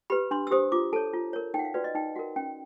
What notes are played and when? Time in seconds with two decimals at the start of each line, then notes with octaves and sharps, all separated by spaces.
0.10 G4 B4 B5
0.31 D4 C6
0.47 E6
0.51 G4 C5 D#6
0.72 F4 D6
0.93 A4 C#5 A5
1.13 F4
1.33 A#4 C#5
1.54 D#4 G5
1.59 F#5
1.65 F5
1.74 F#4 B4 D5
1.84 D#5
1.95 D#4 G5
2.15 F#4 A#4 F#5
2.36 C#4 G5